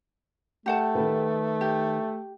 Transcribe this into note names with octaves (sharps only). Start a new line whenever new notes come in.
A3 G4 F#5 A5
D#3 A4 B4
G4